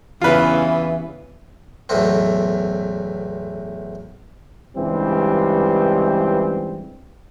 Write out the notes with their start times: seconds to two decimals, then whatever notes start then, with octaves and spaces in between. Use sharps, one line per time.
0.22 E2 G2 C#3 E3 F4 B4
1.89 B1 E2 A2 C4
4.76 C#2 G2 E3 G3 C4